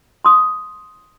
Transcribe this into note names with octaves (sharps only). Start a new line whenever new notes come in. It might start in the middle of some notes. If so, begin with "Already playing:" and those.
C6 D#6